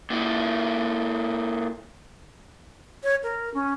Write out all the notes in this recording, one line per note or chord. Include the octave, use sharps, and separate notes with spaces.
A#2 E4
C#5
A#4
C#4